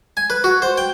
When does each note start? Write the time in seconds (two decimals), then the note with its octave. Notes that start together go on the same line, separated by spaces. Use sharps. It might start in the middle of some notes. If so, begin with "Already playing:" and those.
0.17 G#5
0.30 B4
0.44 F#4
0.62 C5
0.78 G5